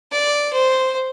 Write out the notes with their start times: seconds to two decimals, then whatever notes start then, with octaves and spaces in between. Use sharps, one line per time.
0.12 D5
0.53 C5